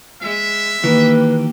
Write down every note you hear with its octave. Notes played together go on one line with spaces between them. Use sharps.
G#3 E5
D#3 E3 A#3 G4 B4